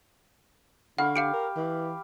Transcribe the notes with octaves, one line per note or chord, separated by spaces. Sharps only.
D3 F5 F#5 B5 C#6
G4 F5 C#7 D7
A#4
E3